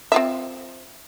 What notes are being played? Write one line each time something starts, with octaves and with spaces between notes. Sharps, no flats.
C4 F4 E5